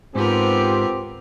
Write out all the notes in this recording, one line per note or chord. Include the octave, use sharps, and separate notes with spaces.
G#2 B3 C4 F4 G4 A#4